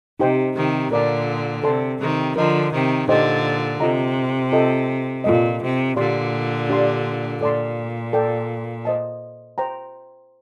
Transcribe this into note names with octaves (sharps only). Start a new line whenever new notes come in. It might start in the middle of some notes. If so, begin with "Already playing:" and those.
C3 D#4 G4 C5 G5
C3 D#3
A#2 D3 A#4 D5 F5 A5
C3 A4 D5 A5 C6
C3 D#3
D3 F3 A#4 D#5 A#5
C3 D#3
A#2 D3 D#4 G4 C5 D#5 G5
C3 F4 A4 D#5 A#5
F4 A4 D#5 G5
A#2 F4 A4 D#5
C3
A#2 D3 G4 D5 F5 C6
D4 G4 D5 F5 C6
A#2 A4 D5 A5 C6
A4 D5 G5
C5 D#5 A5
C5 G5 A#5